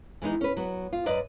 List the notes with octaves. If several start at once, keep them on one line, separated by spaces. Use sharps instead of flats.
E3 G#3 B3 D#4
C#4 B4
F#3 B3
F4
F#2 B4 D5 D#5